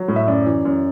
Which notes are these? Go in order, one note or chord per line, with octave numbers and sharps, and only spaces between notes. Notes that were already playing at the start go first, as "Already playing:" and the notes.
Already playing: F#3
A2
E5
F#2 D5
E3
F#2